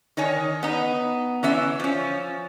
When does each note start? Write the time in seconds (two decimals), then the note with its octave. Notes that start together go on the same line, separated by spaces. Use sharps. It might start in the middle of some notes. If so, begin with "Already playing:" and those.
0.17 D#3 D#4 C#5 G#5
0.63 B3 D#4
1.43 E3 C#4 E5
1.80 F3 C#4